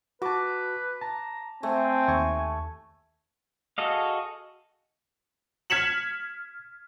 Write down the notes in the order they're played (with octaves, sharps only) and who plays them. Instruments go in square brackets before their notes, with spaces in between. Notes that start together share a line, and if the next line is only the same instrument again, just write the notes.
[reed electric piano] F#4 A5 [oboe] B4 [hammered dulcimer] D6
[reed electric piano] A5 [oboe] A#5
[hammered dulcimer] A3 [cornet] C4 [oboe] G#5
[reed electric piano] D#2 C#6 G#6
[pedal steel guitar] F#4 G#4 A4 D#5 F5
[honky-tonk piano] F6 G#6 B6 C#7 E7 F#7